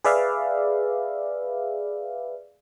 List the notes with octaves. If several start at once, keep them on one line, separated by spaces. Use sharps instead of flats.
G#4 B4 D5 E5 F5